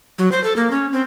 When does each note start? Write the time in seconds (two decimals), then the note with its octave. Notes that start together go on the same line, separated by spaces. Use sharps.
0.18 F#3
0.32 C5
0.44 A4
0.56 A#3
0.71 C#4
0.92 C4